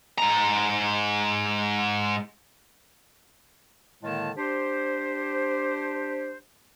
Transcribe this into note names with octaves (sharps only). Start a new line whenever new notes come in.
G#2 A#5
A2 D3 D#3 G#3 A#3 A5
D4 G4 C5